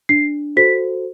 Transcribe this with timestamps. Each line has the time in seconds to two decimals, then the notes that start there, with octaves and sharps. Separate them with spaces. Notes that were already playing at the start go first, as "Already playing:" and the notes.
0.09 D4 C7
0.57 F#4 A4 C5 B6